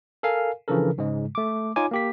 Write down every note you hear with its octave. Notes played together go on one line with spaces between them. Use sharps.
A4 A#4 F5 G#5
C#3 E3 F3 D4 A4 A#4
G#2 C#3 G#3
A3 D6
D#4 F4 C#5 G#5 D6
A#3 G4 B6